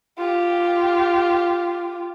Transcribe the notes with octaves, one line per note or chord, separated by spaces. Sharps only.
F4 G4